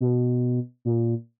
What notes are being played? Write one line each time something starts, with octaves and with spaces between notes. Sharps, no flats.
B2
A#2